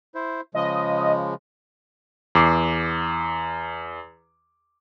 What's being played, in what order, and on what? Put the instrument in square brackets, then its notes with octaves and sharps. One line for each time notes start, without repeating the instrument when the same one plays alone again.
[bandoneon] E4 C5
[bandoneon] C#3 F3 G#3 [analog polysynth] D#5
[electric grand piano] E2 D6 C7